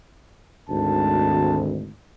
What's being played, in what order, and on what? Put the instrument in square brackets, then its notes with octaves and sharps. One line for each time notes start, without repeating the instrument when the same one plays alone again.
[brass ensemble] G#1 D2 [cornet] A5